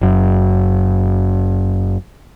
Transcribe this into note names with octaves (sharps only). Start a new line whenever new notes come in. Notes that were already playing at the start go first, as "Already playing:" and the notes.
F#1 F#2